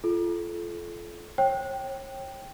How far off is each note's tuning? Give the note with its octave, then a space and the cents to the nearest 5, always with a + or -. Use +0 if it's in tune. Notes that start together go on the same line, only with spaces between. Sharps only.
F4 -25 A4 -35
C#5 -40 G5 +0